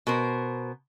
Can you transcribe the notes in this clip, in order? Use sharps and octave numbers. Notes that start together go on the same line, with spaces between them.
B2 A#4 C5